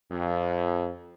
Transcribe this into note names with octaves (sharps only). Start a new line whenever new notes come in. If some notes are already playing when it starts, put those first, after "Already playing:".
F2